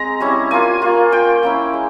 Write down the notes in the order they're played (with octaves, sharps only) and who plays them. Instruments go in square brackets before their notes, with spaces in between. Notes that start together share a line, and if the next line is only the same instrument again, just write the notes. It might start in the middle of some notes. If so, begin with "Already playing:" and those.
Already playing: [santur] G#3 C4 A#5
G3 C#4 E4
A#3 F4 G#5
A#3 F4
A#3 F4 G5
A#3 C#4 E4
G#3